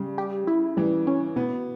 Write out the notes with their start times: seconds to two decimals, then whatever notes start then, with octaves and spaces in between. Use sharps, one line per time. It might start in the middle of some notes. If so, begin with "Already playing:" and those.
Already playing: C#3 G3
0.18 G4
0.47 E4
0.77 E3 G3
1.07 C#4
1.36 B2 B3